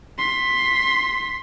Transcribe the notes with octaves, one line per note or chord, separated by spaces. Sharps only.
C6 B6